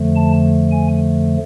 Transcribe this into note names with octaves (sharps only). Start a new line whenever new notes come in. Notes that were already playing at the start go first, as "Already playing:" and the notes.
Already playing: F2 D3 F3 A3
A5
G#5